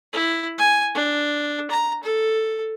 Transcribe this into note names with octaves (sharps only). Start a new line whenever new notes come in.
E4
G#5
D4
A#5
A4